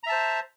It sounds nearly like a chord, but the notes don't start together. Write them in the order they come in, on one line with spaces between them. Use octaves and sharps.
A#5 E5 A5 C5